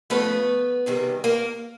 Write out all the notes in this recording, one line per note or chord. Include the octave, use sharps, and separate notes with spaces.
C#3 F3 A3 B3 B4
E2 C3 D#3 G3
A#3 A#4